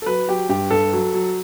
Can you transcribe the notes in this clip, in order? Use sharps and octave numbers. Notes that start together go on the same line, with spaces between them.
A4
F#3 B4
F#3 G4
G2 G4
G2 A4
F#3
F#3